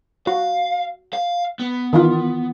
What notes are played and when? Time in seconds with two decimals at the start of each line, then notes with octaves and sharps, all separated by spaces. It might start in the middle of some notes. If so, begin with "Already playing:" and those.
0.27 F#4 F5
1.13 F5
1.59 B3
1.93 D#3 E3 F4